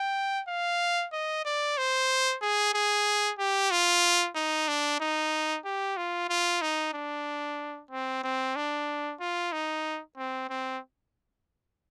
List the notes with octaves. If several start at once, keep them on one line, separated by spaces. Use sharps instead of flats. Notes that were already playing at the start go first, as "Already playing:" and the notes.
Already playing: G5
F5
D#5
D5
C5
G#4
G#4
G4
F4
D#4
D4
D#4
G4
F4
F4
D#4
D4
C4
C4
D4
F4
D#4
C4
C4